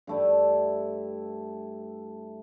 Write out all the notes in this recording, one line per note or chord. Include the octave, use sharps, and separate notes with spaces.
G2 A3 E4